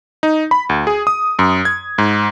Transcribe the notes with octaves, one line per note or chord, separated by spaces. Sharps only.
D#4
B5
D2
G#4
D#6
F#2
G#6
G#2